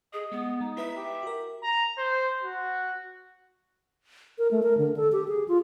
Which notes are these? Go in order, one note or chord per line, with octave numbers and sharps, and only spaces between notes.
G#4 D#5
G#3 B3
G#3 D#4
E4 B4 D#5 E5
G4
F#4 A#4
A#5
C5
F#4
A#4
A3
A#4
D3
A4
G4
G#4
F4